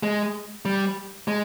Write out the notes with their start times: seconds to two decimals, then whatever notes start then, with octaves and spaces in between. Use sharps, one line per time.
0.03 G#3
0.65 G3
1.28 G#3